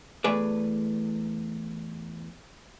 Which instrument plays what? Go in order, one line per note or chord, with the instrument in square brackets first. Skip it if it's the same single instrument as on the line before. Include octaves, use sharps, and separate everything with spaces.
[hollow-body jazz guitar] E2 A3 G#4 B4 D5